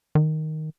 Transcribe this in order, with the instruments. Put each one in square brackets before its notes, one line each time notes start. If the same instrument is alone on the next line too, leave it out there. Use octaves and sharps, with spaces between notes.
[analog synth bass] D#3